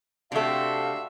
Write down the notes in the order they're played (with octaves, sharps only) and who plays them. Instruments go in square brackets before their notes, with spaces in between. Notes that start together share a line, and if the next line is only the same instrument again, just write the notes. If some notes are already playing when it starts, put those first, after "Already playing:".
[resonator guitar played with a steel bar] C3 A3 [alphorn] D4 [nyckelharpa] F#4 E5 [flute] F5